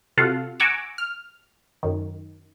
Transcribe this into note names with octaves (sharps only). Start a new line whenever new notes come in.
C3 F4 F#4 A4 F5 F#5
F#5 G#5 A#5 C#6 D6 E6
F6
F#2 D#3